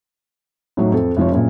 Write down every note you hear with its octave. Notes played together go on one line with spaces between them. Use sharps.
A2 F#3 D#4
F2 A4
F1 F3 C#5
F#1 A#2